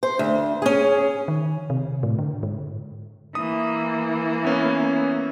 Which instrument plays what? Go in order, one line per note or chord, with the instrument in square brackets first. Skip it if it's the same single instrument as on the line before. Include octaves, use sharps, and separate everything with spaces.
[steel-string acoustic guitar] C5
D2
C#4 G#4
[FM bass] D#3
C3
A2
D3
G#2
[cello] E3 A#3 [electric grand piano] D#6
[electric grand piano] B3 C#4